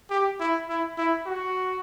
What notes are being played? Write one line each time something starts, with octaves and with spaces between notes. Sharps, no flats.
G4
E4
E4
E4
F#4